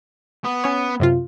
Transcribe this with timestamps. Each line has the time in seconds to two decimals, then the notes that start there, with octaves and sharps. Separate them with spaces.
0.44 B3
0.64 C#4 C#5
1.00 F#2 C3 F4